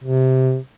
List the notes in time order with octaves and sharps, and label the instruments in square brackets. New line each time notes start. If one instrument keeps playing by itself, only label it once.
[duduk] C3